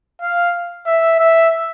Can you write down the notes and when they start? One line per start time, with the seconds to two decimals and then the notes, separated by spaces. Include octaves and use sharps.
0.21 F5
0.86 E5
1.19 E5